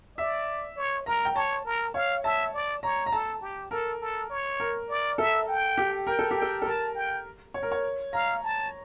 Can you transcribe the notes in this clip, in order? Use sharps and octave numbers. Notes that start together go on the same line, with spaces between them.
D5 E5
C#5
A#4 A#5
G5
C#5 A5
A#4
C#5 F5
E5 A5
D5
C#5 A#5
A#5
A4 A5
G4
A4 A#4
A4
C#5
A#4
D5
A4 E5
G5
G4
A#4 G5
A4
G4 G5
A4
A4
A#4 A5
G5
C#5
A#4
C#5
F5 A#5
A5